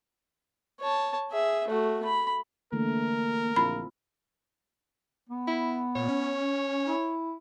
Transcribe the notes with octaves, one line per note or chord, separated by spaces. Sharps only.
C#5 A5
G#4 E5
A3 F#4
B5
D3 E3 A3 A#3 A#4
A#1 C4 E4 F4 B5
B3
E4
A#2 C#5
C#4
E4